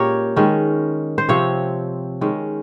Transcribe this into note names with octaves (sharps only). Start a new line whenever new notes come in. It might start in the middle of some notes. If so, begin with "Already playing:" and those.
Already playing: A#2 G#3 C#4 G4 A#4 C#5
D#3 G#3 C#4
C5
C3 F3 C4 C#5
D#3 G#3 C#4